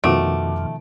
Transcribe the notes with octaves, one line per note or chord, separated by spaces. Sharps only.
F2 B2 D#3 F3 A3 F#4 D6 D7